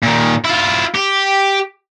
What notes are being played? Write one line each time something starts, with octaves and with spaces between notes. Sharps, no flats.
A#2 D#3
E4 F4
G4